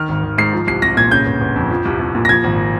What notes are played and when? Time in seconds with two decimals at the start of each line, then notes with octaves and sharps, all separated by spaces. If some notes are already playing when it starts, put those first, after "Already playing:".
Already playing: D#3 F6
0.09 G#1
0.23 G#1
0.38 G#2 C7
0.53 F3
0.67 C2 C7
0.82 C2 A#6
0.97 A#2 G#6
1.11 C#3 G6
1.26 G1
1.41 G1
1.56 F2
1.71 F3
1.85 C2
1.99 C2
2.15 A#2
2.25 A#6
2.29 F3 G#6
2.44 G#1